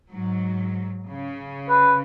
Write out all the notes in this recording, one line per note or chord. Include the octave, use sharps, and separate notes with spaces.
G#2 F#3
C#3
B4